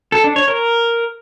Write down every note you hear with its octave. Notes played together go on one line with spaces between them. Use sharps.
A4
D4
C#5
A#4